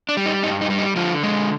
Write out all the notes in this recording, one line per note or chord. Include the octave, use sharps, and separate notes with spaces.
D4
G3
D#4
G2 D#4
D#4
G3
D#4
D3 F3 F4
G#3